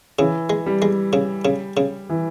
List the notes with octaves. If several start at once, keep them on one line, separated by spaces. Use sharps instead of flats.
C#3 E3
G#3
G3
G#3
C#3
C#3
C#3
E3